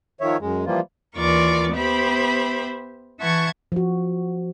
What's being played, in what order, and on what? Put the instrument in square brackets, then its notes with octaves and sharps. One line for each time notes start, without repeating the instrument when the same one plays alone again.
[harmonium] D#3 F3 C#5 E5
F#2 G#3
E3 F3 G3 A#3 F4
[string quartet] D#2 E3 F4 A#4 D5 C#6
B3 G4 C5 E5 B5
E3 E5 F#5 A5 C#6 G#6
[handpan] F3 F#4